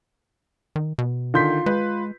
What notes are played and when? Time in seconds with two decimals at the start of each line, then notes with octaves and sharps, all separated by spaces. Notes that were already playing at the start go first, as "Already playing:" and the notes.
0.76 D#3
0.98 B2
1.34 D3 D#3 F4 C6 G6 B6
1.66 G#3 B4